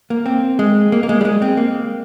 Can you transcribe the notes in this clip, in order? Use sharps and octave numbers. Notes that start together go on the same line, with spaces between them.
A#3
C4
G#3
A#3
A#3
G#3
G3
G#3
C4
A#3